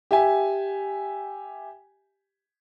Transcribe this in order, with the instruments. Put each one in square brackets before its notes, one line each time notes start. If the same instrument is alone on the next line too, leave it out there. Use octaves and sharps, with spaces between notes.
[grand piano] G4 E5 G#5